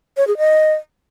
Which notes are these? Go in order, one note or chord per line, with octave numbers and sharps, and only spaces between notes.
C#5
G#4
D#5